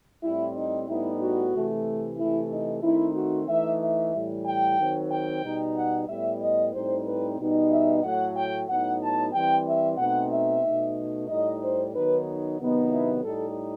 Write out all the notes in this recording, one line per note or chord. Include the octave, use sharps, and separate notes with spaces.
A2 G3 C4 E4
D#4
A2 G3 B3 D#4 E4
F#4
C3 E3 A3
C3 E3 A3 E4
D#4
D#3 A3 C4 D#4 E4
F#4
E3 A3 D#4 E5
E5
A2 E3 G3
G5
D#3 F#3 C4
G5
B2 G3 D#4
F#5
A2 G3 B3 E5
D#5
A2 G3 C4 D#4 C5
B4
B2 G3 B3 D#4
E5
A2 F#3 A3 F#5
G5
A2 F#3 B3 D#4 F#5
A5
E3 G3 C4 G5
E5
B2 A3 C4 D#4 F#5
E5
B2 A3 D#4
A2 G3 D#4 D#5
C5
D#3 F#3 B3 D#4 B4
C3 D#3 F#3 B3 D#4
E4
A2 G3 D#4 A4